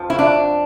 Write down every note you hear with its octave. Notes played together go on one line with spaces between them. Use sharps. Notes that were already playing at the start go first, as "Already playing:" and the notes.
Already playing: F2 F3
E4
D4